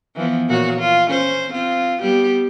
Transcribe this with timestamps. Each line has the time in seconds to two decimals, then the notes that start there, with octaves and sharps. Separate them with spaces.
0.16 E3 F3 B3
0.49 A#2 F#4 C#5
0.80 F4
1.10 C#4 C5
1.52 C4 F4
2.00 G3 B3 G4